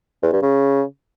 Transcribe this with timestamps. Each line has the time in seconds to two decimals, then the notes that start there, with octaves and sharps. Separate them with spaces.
0.23 E2
0.33 G2
0.43 C#3